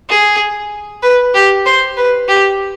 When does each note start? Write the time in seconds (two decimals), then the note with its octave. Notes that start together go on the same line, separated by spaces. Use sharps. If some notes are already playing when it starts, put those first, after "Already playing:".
0.09 G#4
1.03 B4
1.34 G4
1.66 C5
1.97 B4
2.29 G4